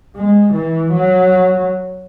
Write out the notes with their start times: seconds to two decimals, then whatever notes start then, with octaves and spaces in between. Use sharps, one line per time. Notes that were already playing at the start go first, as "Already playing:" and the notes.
0.16 G#3
0.54 E3
0.93 F#3